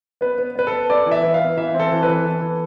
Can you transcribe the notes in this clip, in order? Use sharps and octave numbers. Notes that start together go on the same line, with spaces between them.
B3 B4
B3
B3 B4
A4
B3
B3 D5
E3
E5
B3
F5
B3
E3 E5
C4
A4
E3
E3 B4
B3 A4
E3